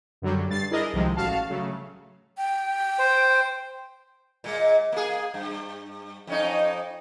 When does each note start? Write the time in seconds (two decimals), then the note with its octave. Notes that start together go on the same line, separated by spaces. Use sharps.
0.22 F#2 D3 F#3 G3
0.49 G2 A6 C7
0.71 D4 E4 G#4 A#4 D#5
0.93 C2 C3 D#3 F3 G#3
1.16 A1 F#4 F5 A5
1.49 C#3 F#3 A3
2.37 G5
2.99 C5
4.44 A#2 G#3
4.92 A#3 G#4
5.34 G2
6.27 F2 C#4 D#4